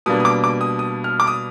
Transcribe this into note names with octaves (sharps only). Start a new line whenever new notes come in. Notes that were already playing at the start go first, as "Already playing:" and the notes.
B2 G3 A#3 D4 D#6
D#6
D6
D6
D#6
D#6
F6
D6
D#6